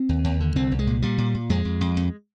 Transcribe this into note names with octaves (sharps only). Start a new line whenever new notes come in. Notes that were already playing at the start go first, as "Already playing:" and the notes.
Already playing: C4
D#2
D#2
D3
C2 C4
C2
G#3
A#2
A#2 G3
A#2
A#2
F2 G#3
F2
F2
F2